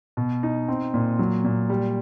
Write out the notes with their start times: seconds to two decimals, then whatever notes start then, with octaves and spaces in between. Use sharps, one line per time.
0.17 B2
0.43 D#4
0.68 C4
0.94 A#2
1.19 F#3
1.44 A#2
1.70 G3